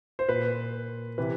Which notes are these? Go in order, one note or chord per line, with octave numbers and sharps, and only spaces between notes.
C5
A#2 B4
C3 E3 B4